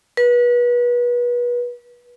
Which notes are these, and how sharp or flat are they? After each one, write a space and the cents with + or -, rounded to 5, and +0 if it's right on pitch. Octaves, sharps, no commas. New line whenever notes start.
B4 -30